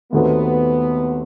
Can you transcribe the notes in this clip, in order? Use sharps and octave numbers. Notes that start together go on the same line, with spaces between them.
D#2 D#3 A3 B3 C4 F#4